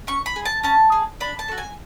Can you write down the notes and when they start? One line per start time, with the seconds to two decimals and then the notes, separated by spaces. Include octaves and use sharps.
0.07 C#4 C#6
0.26 B5
0.36 G#4
0.45 A5
0.63 C#4 A5
0.92 G#4
1.20 D4 B5
1.39 A5
1.48 F#4 A4
1.58 G#5